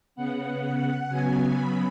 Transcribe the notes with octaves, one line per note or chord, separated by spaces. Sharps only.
C#3 B3 F#5
F#5
C#3 F#3 B3 G#5
B5